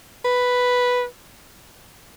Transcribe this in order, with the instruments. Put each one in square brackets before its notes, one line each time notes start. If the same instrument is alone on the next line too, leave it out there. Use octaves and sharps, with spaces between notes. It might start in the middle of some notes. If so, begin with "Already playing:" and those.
[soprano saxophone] B4